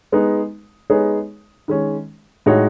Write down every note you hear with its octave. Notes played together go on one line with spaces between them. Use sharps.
G#3 B3 D#4
G#3 B3 D#4 G#4 C#5
D#3 G#3 C#4
A2 G#3 D#4 F#4 C#5